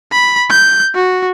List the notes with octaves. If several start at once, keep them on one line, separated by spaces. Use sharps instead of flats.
B5
G6
F#4